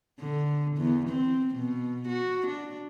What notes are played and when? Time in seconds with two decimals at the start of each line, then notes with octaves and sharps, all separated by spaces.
0.20 D3
0.77 E2
1.09 C4
1.55 B2
2.08 F#4
2.47 D4